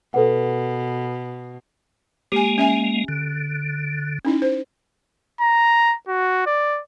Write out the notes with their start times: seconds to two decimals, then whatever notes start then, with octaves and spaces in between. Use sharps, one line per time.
0.14 B2 A4 B4 F#5
2.32 G#3 A#3 G4 G#5
2.58 C#4 E5 G#5
3.08 D3
4.25 C#4 D#4 E4
4.42 C5
5.41 A#5
6.08 F#4
6.46 D5